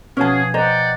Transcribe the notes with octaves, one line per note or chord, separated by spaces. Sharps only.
B2 F3 C#4 F#4 G#4 A5
C5 D5 D#5 F#5 G5 A#5